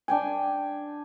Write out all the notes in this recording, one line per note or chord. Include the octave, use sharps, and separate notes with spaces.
D4 G5 G#5